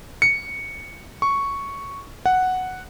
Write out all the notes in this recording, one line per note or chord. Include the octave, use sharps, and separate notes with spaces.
C#7
C#6
F#5